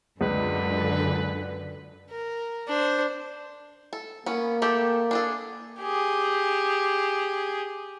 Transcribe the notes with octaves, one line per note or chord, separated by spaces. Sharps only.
C#2 F#2 D3 B4
A#4
D4 C5
A4
A#3 B3 C#4
A3 G4 A4
D4 G#4 A4
G4 G#4